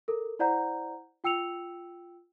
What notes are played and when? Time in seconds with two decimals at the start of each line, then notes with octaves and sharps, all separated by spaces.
0.08 A4 A#4
0.39 E4 C5 D5 F#5 A#5 G6
1.24 F4 G5 E6 C#7 F7